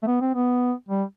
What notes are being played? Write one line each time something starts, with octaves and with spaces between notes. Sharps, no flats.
A3
B3
C4
B3
G3